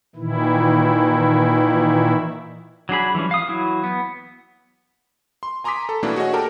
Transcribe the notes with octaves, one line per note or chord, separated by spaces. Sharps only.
A#2 D#3 E3 E4
F#3 D4 G#4 B5
E3 F3 G3 C#4
F5 D#6
E3 F#3 E4
B3
C6
G#5 A#5 C6 D6 D#6 B6
A4
B2 E3 A3 A#3 D4 E4
F#4 G#4 C#5 D#5
G4 A4 A#4 A5